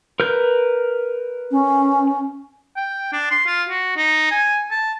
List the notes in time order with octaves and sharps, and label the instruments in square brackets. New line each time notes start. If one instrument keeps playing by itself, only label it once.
[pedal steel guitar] A#4 B4 G6
[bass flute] C#4
[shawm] G5
D4
C6
F4
F#4
D#4
G#5
A5